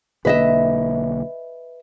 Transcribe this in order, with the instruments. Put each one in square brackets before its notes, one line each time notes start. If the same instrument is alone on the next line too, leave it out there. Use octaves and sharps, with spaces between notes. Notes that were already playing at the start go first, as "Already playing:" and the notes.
[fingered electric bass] B1 D3 A#3 [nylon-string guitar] B4 D#5 E5